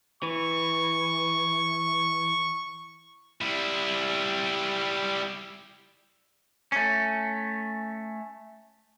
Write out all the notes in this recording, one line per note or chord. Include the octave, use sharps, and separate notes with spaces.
E3 C#6
G3 E4
A3 C#4